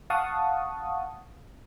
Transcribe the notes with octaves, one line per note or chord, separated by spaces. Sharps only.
F5 F#5 A5 C#6 D#6